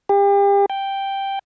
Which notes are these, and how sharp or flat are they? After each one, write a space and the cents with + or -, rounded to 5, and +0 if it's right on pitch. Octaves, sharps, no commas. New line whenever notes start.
G4 +35
G5 +0